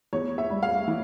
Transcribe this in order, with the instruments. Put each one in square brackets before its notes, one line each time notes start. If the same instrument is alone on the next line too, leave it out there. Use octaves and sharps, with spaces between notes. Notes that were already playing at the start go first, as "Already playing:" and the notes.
[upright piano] E2 C#5
E5
G3
F5
E3